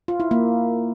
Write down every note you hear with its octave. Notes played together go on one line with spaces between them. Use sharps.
F4
E4
A#3